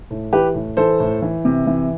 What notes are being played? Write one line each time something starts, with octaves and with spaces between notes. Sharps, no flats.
A2
E3 G4 B4
A2
E3 A4 C5
A2
E3
C3
E3